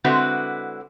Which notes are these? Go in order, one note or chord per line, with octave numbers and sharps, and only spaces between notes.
D3 G#3 C4 E4 F#4 B4